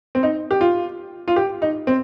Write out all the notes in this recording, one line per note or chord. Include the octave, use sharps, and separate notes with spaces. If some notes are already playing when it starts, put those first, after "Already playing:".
C4
D#4
G4
F4
F4
G4
D#4
C4